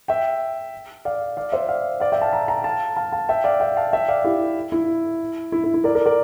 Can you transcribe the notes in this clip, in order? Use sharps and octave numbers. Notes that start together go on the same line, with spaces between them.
E5 G5
D5 F5
D5 F5
C5 E5
D5 F5
D5 F5
E5 G5
F5 A5
G5 A#5
G5 A#5
F5 A5
F5 A5
F5 A5
E5 G5
D5 F5
E5 G5
F5 A5
E5 G5
D5 F5
E4 G4
E4
E4
E4
E4
A#4 D5
A#4 D5
A#4 D5